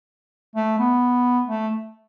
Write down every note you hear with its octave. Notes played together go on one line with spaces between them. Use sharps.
A3
B3
A3